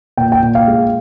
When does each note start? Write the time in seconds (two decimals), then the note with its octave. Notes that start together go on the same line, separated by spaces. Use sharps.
0.17 A#2 G5
0.32 G5
0.43 A#2
0.55 F5
0.68 G#3